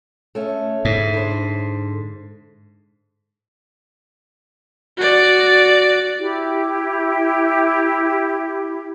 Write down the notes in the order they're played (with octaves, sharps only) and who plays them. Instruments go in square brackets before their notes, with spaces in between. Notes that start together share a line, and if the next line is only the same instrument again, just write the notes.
[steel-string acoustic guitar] A3 C#4
[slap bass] G#2 [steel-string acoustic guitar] E4
[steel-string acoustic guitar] D3 C5
[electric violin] F#4 D5
[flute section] E4 G4